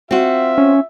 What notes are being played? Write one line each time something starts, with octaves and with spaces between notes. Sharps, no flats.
C4 F4 F#4 E5
C#4